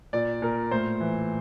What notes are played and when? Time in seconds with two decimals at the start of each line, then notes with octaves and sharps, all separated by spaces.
0.13 A#2 D5
0.42 A#2 A#4
0.71 A2 C5
1.00 E3